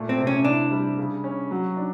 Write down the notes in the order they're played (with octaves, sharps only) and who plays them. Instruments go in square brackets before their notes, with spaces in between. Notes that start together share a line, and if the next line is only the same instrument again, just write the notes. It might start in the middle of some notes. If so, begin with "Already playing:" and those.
Already playing: [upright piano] A#2 A3
[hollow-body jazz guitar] C4
[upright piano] C3
[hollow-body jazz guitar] C#4
[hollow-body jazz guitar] D4 [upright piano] E4
[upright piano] G3
C#3
C#4
F#3
D4